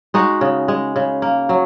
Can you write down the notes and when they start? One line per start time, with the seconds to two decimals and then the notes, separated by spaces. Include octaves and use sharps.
0.14 G#3 D#4 F#4
0.41 C#3
0.68 G#3
0.96 C#3
1.22 A#3
1.49 F#3